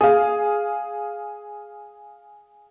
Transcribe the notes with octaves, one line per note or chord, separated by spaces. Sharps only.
G#4 F5